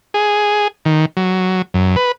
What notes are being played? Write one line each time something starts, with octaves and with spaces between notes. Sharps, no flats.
G#4
D#3
F#3
F#2
B4